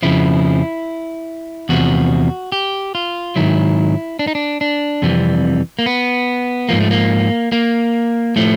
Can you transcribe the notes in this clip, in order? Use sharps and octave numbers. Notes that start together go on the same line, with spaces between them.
F2 C#3 F3 E4
E2 C3 F3 F#4
G4
F4
G#2 D#3 F#3 E4
D4
D#4
D4
D4
F2 C3 E3 G3
A#3
B3
G#2 F3 A#3
A3
A#3
A#3
A2 F3 A3